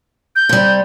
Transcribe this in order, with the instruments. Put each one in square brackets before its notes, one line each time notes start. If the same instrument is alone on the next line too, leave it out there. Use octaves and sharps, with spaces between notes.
[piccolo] G6
[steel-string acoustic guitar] C3 G3